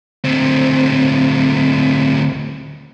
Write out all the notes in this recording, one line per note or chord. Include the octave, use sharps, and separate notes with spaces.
D2 C4